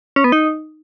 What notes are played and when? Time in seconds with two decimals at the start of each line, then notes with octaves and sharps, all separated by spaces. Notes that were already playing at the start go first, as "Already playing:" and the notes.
0.16 C#4
0.24 B3
0.32 D#4